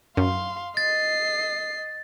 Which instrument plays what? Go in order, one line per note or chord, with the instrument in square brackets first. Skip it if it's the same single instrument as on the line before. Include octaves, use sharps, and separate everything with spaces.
[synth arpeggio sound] F#2 [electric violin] F5 C6
[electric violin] D#5 C7 [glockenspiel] A6